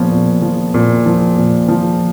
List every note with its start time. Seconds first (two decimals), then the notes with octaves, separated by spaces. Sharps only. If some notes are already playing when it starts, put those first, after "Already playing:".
Already playing: A#2 F3 B3 C#4
0.11 A#2
0.42 F3
0.74 A#2
1.06 F3
1.37 A#2
1.69 F3